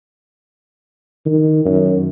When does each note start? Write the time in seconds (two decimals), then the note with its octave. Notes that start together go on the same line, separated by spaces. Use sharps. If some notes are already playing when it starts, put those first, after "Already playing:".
1.26 D#3
1.65 F#2